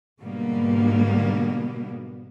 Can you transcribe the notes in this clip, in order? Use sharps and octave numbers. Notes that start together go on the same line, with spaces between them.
G#2 B2 D3 G3 A#3 B3